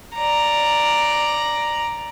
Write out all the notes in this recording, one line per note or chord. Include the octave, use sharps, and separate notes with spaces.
D5 A#5